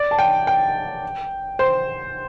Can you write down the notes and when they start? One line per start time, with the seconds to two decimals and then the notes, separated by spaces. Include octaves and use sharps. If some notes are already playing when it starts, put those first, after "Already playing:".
Already playing: D5
0.11 A5
0.19 G5
0.47 G5
1.59 C5